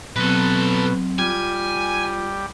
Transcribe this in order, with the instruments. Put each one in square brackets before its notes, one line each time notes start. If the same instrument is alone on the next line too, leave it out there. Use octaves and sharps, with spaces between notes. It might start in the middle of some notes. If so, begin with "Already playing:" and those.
[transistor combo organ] B2 [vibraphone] F#3 C4 [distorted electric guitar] A4 B4
[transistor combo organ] G3 [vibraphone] F4 [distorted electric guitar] G#5